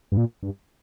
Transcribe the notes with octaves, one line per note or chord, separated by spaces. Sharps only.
G2
A#2
G2